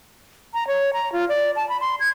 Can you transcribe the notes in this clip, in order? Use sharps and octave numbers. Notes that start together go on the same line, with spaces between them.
A#5
C#5
A#5
F4
D5
A5
B5
C6
G#6